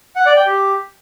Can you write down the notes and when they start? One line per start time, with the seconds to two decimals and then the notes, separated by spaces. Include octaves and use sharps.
0.16 F#5
0.26 D5
0.36 G5
0.46 G4